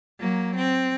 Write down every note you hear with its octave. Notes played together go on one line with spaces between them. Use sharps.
F#3 A#3
C4